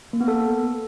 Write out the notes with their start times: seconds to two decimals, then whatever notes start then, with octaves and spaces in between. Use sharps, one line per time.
0.13 A#3
0.21 B3
0.28 A4